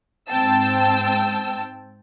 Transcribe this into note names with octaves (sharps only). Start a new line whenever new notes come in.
G#2 C4 G5 A5 E6